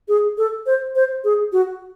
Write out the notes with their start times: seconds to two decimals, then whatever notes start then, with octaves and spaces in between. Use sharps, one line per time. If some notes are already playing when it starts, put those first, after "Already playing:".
0.08 G#4
0.38 A4
0.66 C5
0.95 C5
1.24 G#4
1.52 F#4